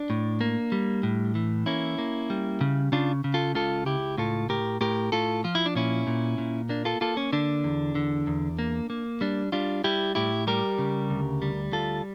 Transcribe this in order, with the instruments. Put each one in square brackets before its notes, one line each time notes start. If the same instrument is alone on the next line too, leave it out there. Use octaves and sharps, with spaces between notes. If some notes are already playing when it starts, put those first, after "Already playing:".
Already playing: [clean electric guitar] D4
A2
A#3
G3
A2
E3
A#3 C#4 E4
A#3
G3
C#3
C#3 D4 F4
C#3
F4 A4
C#2 F4 A4
C#2 E4 G4
A2 F4 A4
A2 G4 A#4
A2 G4 A#4
A2 F4 A4
F3 F4
E4
D4
A#2 C#4 E4
A#2
A#2
A#3 D4
F4 A4
A#3 F4 A4
C#4
D3 D4
E2
D3
E2
A#3
A#3
G3 D4
G3 D4 F4
G3 E4 G4
A2 E4 G4
G3 G4 A#4
C#3
D2
G3
D2 F4 A4